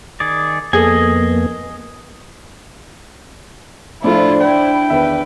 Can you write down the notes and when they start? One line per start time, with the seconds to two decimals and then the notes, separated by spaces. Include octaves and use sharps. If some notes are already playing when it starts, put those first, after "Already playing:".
0.20 D#3 G#4 D5
0.73 F2 A#3 B3 G#4 A4 D#5 G#5
4.04 A2 F3 A3 D4 E4 F4 C5 D5
4.41 E4 C5 G5
4.90 E2 D#3 B4 E5